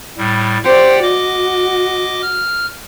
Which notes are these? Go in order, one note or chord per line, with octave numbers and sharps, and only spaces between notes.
A2 G3
G4 C5 D5 F#5 G5
F#4 D#5 D6
F6